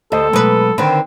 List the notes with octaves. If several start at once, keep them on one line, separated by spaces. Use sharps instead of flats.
D2 G4 A4 C5 D#5
B2 F#3 G#3 B4
D3 D#3 C4 B4